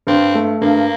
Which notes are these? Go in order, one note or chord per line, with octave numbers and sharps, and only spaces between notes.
G2 C4
A3
G2 A#3